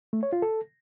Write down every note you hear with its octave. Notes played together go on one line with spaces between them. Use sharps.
A3
C#5
F4
A4